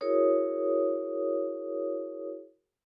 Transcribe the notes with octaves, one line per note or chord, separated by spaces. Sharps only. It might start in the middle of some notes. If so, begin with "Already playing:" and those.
E4 F#4 G#4 A#4 C#5 D#6